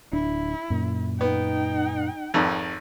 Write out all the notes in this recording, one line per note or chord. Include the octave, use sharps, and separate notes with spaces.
D1 D4 E4
F#2 A#2
B3 D#4 G5
G#1 F2